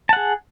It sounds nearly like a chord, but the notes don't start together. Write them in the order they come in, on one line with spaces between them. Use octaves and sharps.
A5 F#5 G#4